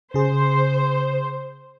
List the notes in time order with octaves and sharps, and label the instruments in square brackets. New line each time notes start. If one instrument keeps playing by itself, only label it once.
[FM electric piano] C#3 G#4 [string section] C5